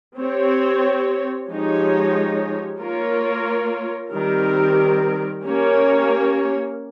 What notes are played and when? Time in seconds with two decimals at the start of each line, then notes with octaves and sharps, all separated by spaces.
0.18 C4 G4 C#5
1.50 F3 G#3 D#4 G4 C#5
2.81 A#3 F4 A#4 C#5
4.12 D#3 G3 C4 G4 A#4
5.45 A#3 C#4 G4 A#4 C#5